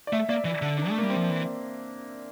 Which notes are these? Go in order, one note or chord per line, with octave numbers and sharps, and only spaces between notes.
D5
A3 E5
A#3 D5
E3 D5
D3
D4
A3
G3 A#3
C4
F3
E3